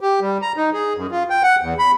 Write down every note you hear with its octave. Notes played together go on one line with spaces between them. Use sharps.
G4
G3
A#5
D#4
G#4
F#2
F4
G5
F#5
E2
B5